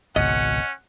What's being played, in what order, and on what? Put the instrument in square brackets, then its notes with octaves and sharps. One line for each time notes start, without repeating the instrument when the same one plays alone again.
[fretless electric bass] G#1 C#2 B2 [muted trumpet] C#4 [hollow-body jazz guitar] D#5 [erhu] F#5